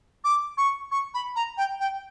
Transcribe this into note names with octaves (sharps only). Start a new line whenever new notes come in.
D6
C#6
C#6
B5
A#5
G5
G5